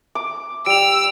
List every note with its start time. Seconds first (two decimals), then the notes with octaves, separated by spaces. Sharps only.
0.15 D6
0.66 G3 E6 D7 F7